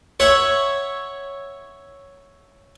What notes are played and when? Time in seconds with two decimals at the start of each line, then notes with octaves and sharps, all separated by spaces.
0.20 C#5 E5 F#5